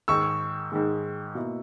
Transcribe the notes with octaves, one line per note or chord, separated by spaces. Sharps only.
G#2 D#3 G#3 C#6 E6
G#2 D#3 G#3
B2 A#3 E4